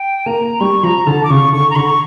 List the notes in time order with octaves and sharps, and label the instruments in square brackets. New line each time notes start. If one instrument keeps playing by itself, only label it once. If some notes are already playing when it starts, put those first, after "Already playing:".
Already playing: [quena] G5
[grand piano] A#3 [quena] A#5
[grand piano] G3 [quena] C#6
[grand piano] F3 [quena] A#5
[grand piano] D3 [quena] A5
[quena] D6
[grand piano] C#3 [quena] C#6
[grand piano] D3 [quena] C#6
[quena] A#5
[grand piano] D3 [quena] C#6